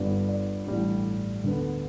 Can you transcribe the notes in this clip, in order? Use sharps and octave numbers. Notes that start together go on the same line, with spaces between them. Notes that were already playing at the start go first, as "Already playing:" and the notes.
Already playing: G1 G2 D3 G3 B3 D5
D5
A1 A2 G3 D4
D2 D3 B3